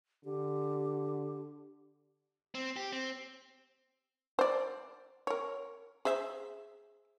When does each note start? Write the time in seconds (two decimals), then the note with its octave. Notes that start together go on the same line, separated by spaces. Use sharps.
0.25 D3 G4
2.55 C4
2.76 G4
2.93 C4
4.39 C5 D5
5.27 A#4 C#5
6.05 G#4 C5 E5